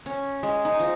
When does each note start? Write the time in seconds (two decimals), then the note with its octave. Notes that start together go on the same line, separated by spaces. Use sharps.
0.06 C#4
0.43 G#3
0.65 D#4
0.80 F3